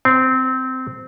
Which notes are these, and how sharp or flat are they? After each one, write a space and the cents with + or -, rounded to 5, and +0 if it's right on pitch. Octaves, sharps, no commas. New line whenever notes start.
C4 -15